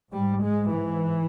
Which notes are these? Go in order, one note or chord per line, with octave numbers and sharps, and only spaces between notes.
G#2 G3
G#3
E3